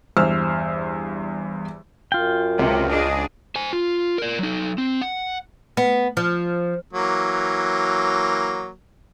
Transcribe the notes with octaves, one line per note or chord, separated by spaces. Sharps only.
E2 G2 C5 E6 F6
F#2 F4 G5
C#2 C3
D4 G#4 D#5
C5 G#5
F4
A#4 D5
F#3 D#4
C4
F#5
B3
F3
E3 F#3 A#3